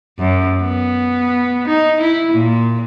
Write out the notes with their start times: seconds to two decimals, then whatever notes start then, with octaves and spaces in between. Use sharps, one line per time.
0.19 F#2
0.63 B3
1.68 D#4
2.01 E4
2.32 A#2